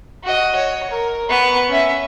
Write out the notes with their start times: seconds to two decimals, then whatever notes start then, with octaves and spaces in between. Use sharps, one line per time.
0.23 F#4 D#5
0.55 C#5
0.91 A#4
1.29 B3 C#6
1.70 C#4 E5